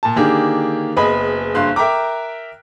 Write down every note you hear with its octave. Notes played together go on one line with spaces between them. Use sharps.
A#2 A5
D3 D#3 A#3 D4 G4 G#4
F#1 B3 G#4 D#5 G#5 B5
F#1 G2 F5 C6 F#6
A#4 E5 G5 A#5 D6